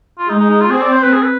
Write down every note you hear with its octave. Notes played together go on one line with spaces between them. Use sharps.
F4
G#3 D#4
D#4
D#4
F4
C4 G#4
D5
C5
B4
G#4
B4